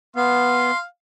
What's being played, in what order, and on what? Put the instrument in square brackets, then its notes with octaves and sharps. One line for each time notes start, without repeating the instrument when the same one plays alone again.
[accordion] B3 [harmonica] F5 [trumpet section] C6